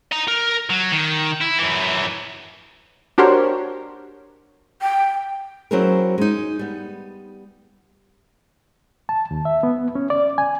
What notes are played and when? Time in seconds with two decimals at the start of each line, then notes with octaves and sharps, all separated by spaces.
0.12 D#5 A#5
0.28 A#4
0.70 F#3
0.92 D#3
1.41 E4
1.59 F#2 E3
3.18 D4 F#4 G4 A#4 C5 C#5
4.82 G5
5.71 F#3 C4 C#4 E4 G#4 A#4
6.18 G#3 D#4
6.59 G3 B3
9.09 A5
9.31 D#2
9.45 E5
9.63 B3
9.95 C#4
10.10 D5
10.38 G#5